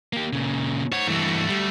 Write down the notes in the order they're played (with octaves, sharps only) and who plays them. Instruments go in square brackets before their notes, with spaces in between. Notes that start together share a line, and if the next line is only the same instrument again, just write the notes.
[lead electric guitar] A#3 G4
A#2 C#3
[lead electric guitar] C5 F#5 [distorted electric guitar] C#5
[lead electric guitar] G2 E3 [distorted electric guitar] A3 F#4
[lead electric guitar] G3